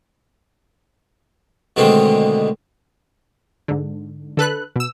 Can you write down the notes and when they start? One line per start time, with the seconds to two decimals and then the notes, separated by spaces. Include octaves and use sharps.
1.76 B2 D3 D#3 G#3 A3 C4
3.68 G#2 D3
4.37 D3 A4 B4 F#6
4.76 B2 E6